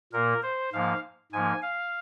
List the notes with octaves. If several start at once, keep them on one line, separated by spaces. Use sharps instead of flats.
A#2 A#3 A#4
C5
G#2 F3 A#3 F5
G#2 F3 A#3 G#5
F5